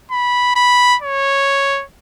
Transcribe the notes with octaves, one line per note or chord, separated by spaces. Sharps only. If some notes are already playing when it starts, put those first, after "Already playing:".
B5
B5
C#5